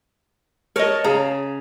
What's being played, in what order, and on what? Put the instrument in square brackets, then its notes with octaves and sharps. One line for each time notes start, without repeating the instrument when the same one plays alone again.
[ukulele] A#4 D#5 [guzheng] C#5 A5
[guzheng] C#3 [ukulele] G#4 A#5